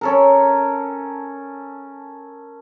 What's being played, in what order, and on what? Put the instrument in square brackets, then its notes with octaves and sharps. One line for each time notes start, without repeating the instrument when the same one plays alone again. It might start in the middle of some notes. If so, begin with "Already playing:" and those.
[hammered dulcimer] C#4 A4 A#4